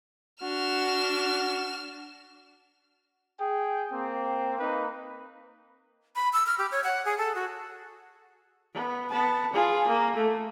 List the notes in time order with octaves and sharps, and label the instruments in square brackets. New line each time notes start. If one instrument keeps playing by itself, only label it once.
[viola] D4 [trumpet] F#4 [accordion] F#5 [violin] F6 E7
[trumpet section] G#4 G5
A#3 C4
A#3 D#4 B4
[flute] B5
E6
F6
G4
C#5
F#5
G#4
A4
F#4
[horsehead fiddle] B3
B3 A5
F4 G#4
A#3
A3